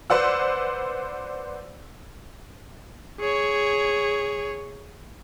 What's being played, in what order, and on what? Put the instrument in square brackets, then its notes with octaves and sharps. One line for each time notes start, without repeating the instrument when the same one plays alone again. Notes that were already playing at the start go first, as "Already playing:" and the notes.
[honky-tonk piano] B4 C5 D5 F#5 E6
[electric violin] G#4 C#5